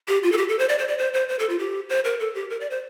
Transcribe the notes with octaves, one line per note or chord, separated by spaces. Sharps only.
G4
F4
A4
G4
A4
C5
D5
C5
D5
C5
C5
C5
A4
F4
G4
C5
A#4
A4
G4
A#4
D5
C5